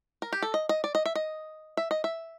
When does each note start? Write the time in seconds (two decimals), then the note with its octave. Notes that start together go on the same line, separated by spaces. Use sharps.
0.22 A#4
0.33 G4
0.42 A4
0.54 D#5
0.69 D#5
0.84 D5
0.95 D#5
1.06 E5
1.15 D#5
1.77 E5
1.91 D#5
2.04 E5